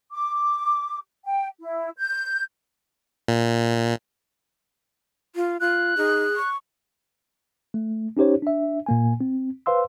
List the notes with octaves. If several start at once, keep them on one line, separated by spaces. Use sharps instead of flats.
D6
G5
E4
G6
A#2
F4
F4 F#6
D#4 G#4
C#6
A3
C#4 D#4 G4 C5 C#5
D4 E5
A#2 A#3 G#5
C4
B4 C5 F5 C6 E6